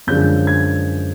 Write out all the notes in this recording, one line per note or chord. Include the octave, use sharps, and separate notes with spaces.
F#2 D3 F3 G#3 G6
G#6